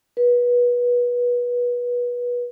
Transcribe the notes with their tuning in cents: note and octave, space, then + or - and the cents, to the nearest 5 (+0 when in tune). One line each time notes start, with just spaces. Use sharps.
B4 -25